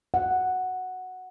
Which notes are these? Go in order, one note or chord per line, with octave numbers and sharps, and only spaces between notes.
F#5